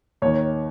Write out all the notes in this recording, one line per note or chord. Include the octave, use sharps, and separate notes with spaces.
D#2 D#3 C#5